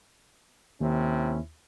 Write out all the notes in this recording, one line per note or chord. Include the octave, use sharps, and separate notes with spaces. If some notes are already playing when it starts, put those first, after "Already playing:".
D#2 C3 C#4 E4